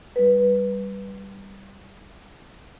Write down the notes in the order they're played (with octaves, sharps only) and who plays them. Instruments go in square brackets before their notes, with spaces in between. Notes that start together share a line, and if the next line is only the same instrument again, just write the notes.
[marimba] G3 B4